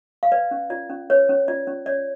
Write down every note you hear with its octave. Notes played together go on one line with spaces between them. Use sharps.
F5
B4 D5
C#4
F4 D5
C#4
B4 C#5
C#4
F4 D5
C#4
C#5 D5